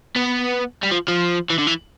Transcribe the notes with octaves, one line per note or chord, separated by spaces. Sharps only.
B3
G3
F3
F3
E3
D3
E3